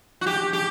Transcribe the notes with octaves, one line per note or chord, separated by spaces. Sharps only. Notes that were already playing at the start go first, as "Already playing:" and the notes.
F#4
G4
G4